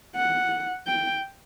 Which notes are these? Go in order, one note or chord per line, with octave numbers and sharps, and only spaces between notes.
F#5
G5